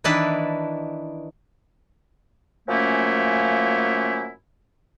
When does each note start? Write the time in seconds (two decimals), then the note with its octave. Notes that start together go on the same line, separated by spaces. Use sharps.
0.04 D#3 E3 D4 E4 B4 A5
2.69 F#2 F3 A3 A#3 C#4 E4